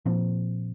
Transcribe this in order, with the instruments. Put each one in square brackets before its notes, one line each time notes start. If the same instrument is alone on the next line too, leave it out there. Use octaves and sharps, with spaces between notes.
[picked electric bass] A#2 F3 C4